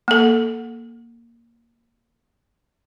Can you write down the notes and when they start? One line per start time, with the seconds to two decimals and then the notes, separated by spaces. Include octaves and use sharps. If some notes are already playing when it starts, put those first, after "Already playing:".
0.08 A#3 A4